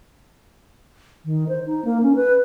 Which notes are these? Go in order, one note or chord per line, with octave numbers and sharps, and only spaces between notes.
D#3
C5
D#4
A#3
C#4
B4